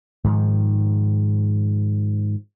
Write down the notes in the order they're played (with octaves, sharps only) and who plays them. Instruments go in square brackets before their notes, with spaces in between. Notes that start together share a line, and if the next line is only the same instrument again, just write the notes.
[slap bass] G#2 D#3 F3